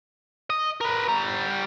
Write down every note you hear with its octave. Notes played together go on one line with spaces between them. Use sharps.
D#5
A#4 B4
G3 A#5